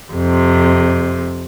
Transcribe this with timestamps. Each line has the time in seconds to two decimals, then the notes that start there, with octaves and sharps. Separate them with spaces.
0.12 F2 C3